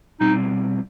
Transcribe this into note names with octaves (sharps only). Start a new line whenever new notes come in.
B2 G3 C4 D#4